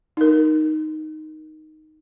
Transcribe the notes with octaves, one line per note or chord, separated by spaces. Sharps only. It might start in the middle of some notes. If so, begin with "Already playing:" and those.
D#4 A#4